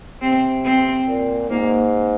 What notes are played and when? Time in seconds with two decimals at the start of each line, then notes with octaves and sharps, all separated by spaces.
0.22 C3 C4
0.65 C4
1.08 A#2
1.50 G#2 A#3